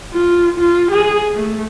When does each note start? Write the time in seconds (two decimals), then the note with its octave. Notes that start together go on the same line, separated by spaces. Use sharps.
0.12 F4
0.58 F4
0.92 G#4
1.35 A3